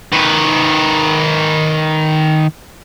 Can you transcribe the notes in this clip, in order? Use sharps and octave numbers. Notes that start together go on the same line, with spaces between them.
D#3 B4